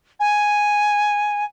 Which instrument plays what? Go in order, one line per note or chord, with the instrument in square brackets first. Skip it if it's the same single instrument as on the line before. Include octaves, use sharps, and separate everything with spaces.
[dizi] G#5